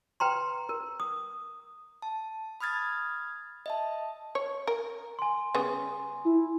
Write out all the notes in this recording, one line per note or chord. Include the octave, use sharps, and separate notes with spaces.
B4 G5 A#5 C6
A#4
D#6
A5
B5 D#6 F6 G#6 A6
D#5 E5 A5
C#5
A#4
G#5 C6
C#3 G3 B3
E4